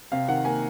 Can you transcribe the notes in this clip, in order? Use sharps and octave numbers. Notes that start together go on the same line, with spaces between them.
C3 F5
D#3 F#5
A#3 G#5